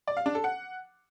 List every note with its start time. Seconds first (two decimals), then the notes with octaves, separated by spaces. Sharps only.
0.08 D5
0.17 F5
0.26 D4
0.35 A4
0.44 F#5